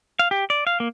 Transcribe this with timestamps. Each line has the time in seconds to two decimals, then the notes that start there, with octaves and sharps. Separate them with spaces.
0.19 F5
0.31 G4
0.50 D5
0.67 F5
0.80 A#3